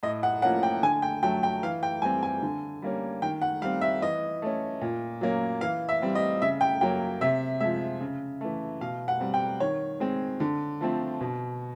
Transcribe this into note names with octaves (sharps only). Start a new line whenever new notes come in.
A2 D#5
F#5
F3 A#3 C#4 F#5
G5
D3 G#5
G5
F#3 A3 G5
G5
E3 F5
G5
G3 C4 G#5
G#5
D3
G3 A#3 C#4
D#3 G5
F#5
G3 C4 F5
E5
E3 D#5
A3 C#4
A#2
F#3 A#3 C#4
E3 F5
E5
G3 C4
D#5
C#3 E5
G5
F#3 A#3 C#4 G5
C3 E5
F3 G#3 E5
C#3
E3 A3
B2 F5
F#5
G3 C4
G5
D#3 C#5
G#3 C4
D3
F3 A3 C4
B2